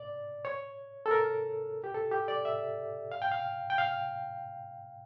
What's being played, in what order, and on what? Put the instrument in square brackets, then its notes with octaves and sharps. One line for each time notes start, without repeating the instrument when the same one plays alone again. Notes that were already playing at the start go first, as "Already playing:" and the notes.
Already playing: [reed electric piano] D5
C#5
A4
A#4
G4
A4
G4
D5
E5
F5
G5
F5
G5
F5